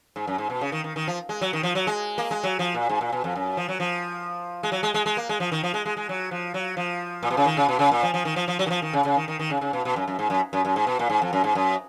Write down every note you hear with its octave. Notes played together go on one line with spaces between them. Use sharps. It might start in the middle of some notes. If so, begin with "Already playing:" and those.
G#2
F#2
G#2
B2
C#3
D#3
D#3
D#3
F3
G#3
F#3
D#3
F3
F#3
G#3
A#3
G#3
F#3
F3
A#2
G#2
A#2
B2
F2
F#2
F3
F#3
F3
G#3
F#3
G#3
G#3
G#3
A#3
G#3
F3
D#3
F3
G#3
G#3
G#3
F#3
F3
F#3
F3
A#2
B2
C#3
D#3
C#3
B2
C#3
A#2
F3
F3
D#3
F3
F3
F#3
D#3
F3
D#3
C#3
C#3
D#3
D#3
D#3
C#3
C#3
B2
B2
F#2
F#2
G#2
F#2
F#2
F#2
G#2
B2
A#2
G#2
F2
F#2
G#2
F#2